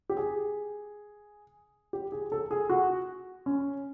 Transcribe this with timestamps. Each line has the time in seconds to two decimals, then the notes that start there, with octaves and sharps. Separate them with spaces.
0.09 G4
0.17 G#4
1.93 G4
2.12 G#4
2.32 A4
2.51 G#4
2.70 F#4
3.46 C#4